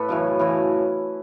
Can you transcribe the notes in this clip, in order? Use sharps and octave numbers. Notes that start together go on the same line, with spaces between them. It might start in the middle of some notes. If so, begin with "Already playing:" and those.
Already playing: A2 A4 B4
F#2 C#3 E3
F#2 C#3 E3